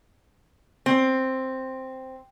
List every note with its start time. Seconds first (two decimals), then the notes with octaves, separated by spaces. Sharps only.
0.86 C4